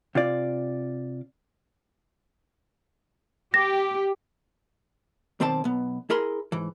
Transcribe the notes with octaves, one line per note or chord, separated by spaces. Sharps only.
C3 F4 D5
G4 A#6
B1 D#3 C4 C5 D5 A5
B1 B3
E4 G#4 A#4 B5 C6
G#2 E3